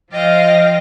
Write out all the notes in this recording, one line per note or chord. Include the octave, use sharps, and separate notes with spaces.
F3 D#5 F5 G5 A#6